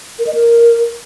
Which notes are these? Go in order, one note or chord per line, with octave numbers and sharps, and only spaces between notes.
A#4
D#5
A#4